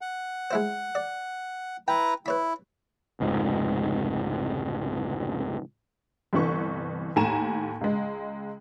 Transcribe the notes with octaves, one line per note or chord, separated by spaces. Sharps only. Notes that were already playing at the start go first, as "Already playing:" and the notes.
F#5
G#3 E4 C5
D5
E4 B4 G5 A#5
E4 B4 C#5 B5
F1 C#2 G#2
G1 C2 E3 C#6
D#2 A2 G#5 A#5 D#7 E7
C#2 G#3